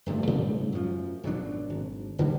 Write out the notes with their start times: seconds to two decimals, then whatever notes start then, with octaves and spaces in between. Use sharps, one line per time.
0.06 D1 G2 F3 A3
0.27 G#2 C#3 G3 A3
0.72 F#2 F3
1.23 G#1 B2 F#3 D4
1.70 G#1
2.18 D1 D3 E3 G3